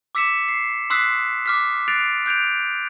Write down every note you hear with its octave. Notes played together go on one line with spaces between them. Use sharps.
D6 E6 B6 C#7 E7
C7
C6 D#6 E6 F#6 B6 C7
D6 F6 B6
F#6 A6 C7 D7 F7
F#6 G6 D7 F7